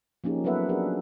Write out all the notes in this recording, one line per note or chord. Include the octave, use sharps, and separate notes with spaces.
F3 A#3 C#4 D#4 G4 G#4
F#3 B3 A4 B4 E5 F#5
D4 F#4 G#4 A#4